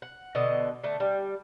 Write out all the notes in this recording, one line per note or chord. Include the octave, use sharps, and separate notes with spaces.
F#5
B2 D3 D#5
D3 A3
G3